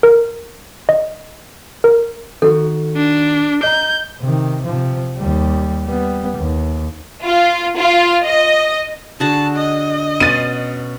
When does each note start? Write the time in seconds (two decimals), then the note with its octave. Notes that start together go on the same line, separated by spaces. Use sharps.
0.03 A#4
0.89 D#5
1.84 A#4
2.42 D#3 F#4 A4
2.97 D4
3.63 D#5 A#5 G6
4.21 C3 D#3
4.65 C3 F3
5.17 D#2 G3
5.85 G3 B3
6.37 D#2
7.25 F4
7.78 F4
8.25 D#5
9.20 D3 F#4 G#4 A5
9.56 D#5
10.20 B2 C#4 C6 A6 D#7